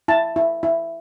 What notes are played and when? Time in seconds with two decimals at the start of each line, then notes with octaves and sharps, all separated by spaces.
0.08 E4 A5
0.36 E4
0.63 E4